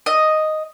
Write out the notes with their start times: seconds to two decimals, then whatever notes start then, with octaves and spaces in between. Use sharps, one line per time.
0.06 D#5